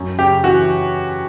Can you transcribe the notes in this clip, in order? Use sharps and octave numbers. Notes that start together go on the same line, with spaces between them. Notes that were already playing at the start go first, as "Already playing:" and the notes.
Already playing: F#2
C#3 G4
E3 F#4